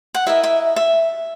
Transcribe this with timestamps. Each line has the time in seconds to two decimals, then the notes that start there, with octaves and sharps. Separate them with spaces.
0.15 F#5
0.26 E4 A#4 D#5 E5
0.44 E5
0.76 E5